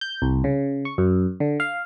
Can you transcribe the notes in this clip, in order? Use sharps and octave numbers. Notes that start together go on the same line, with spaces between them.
G6
C2
C#3
C#6
F#2
D3
F5